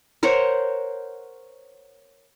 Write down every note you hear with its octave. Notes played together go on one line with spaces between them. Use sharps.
A#4 C5 C#5 F#5